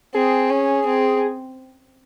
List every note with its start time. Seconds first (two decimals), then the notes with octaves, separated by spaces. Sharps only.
0.14 C4 G#4
0.50 C#4
0.86 C4